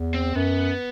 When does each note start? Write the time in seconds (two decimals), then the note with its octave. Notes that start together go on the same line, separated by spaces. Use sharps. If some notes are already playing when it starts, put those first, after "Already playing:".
Already playing: E2
0.14 C4
0.35 F#2 B3